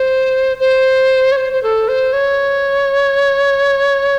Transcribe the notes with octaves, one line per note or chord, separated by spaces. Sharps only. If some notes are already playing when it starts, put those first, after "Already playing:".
Already playing: C5
C5
C#5
C5
C5
A4
C5
C#5